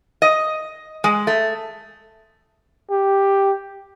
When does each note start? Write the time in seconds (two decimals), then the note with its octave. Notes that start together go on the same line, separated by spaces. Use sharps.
0.22 D#5
1.04 G#3
1.27 A3
2.91 G4